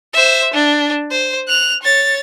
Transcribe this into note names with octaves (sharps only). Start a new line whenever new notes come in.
C5 E5
D4
C5
F#6 F7
C#5 A6